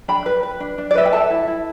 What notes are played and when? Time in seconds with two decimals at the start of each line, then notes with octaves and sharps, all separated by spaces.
0.08 D4 G5 B5
0.26 B4
0.43 B4
0.60 D4
0.78 D4
0.91 D5
0.95 B4 E5
1.06 G5
1.13 A4 E5 A5
1.30 E4
1.47 E4